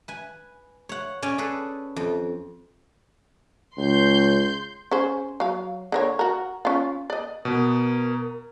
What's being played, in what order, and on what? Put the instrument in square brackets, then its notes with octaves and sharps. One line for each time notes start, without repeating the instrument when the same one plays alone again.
[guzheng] B4 G#5
C#5 F#5
C#4 C#5 D5 G#5
G#4 A4 B4
F2
[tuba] C#2 [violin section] C6 G6
[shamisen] C#4 G#4 C5
F#3 F5
D3 A#4 C#5
F#4 A#4
C#4 F4
D5 D#5
[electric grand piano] B2 B3 [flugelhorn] A#4